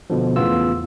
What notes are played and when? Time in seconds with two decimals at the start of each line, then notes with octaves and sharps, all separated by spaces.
0.10 B2 D3 F3
0.36 E2 A2 C#3 B3 F4 E6